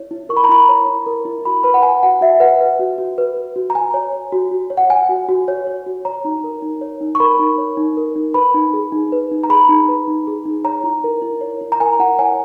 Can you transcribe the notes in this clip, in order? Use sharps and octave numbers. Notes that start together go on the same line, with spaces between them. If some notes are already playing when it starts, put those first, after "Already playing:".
Already playing: E4 C#5
E4
A#4 C#6
B5
A#5
E4 B5
C#5
E4
A#4
E4
F#4 B5
B4 B5
F#5
B4 G#5
F#4 F#5
F#4 E5
B4 F#5
B4
F#4
F#4
B4
B4
F#4
A#5
F#4 G#5
C#5
C#5
F#4
F#4
C#5
F#5
C#5 G#5
F#4
F#4
C#5
C#5
F#4
C#5 A#5
D#4
A#4
D#4
C#5
D#4
C#6
A#4 B5
D#4
C#5
D#4
A#4
D#4
B4 B5
D#4
G#4
D#4
B4
D#4
A#5
G#4 B5
D#4
B4
D#4
G#4
D#4
C#5 A#5
E4
A#4
E4
C#5
E4
A#5
A#4 G#5
E4 F#5
C#5 G#5